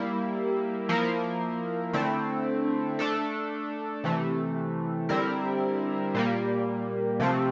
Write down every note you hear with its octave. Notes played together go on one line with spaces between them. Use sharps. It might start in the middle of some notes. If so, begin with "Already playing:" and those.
Already playing: G3 A#3 E4
F3 A#3 E4 A#4
D3 A3 C4 E4
A3 D4 A4
C3 E3 A3
D3 G3 C4 E4 A#4
A#2 G3 A#3
C3 F3 A3 C4